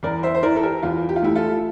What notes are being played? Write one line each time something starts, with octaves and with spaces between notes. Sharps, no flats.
E2 A#4 D5
C5 E5
C5
E3 A#4 D5
A4
G4 A#4
E2 F4
G4
F4
A3 E4 G4
F4 A4